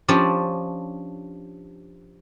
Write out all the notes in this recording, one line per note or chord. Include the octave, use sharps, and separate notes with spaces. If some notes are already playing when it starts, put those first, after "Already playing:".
F3 C#4 D4 G4 C5 D5